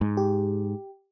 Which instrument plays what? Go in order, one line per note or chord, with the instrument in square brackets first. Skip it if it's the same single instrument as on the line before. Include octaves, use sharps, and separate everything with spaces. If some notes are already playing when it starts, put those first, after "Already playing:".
[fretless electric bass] G#2
[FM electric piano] G4